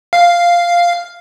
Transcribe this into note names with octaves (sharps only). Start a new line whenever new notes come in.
F5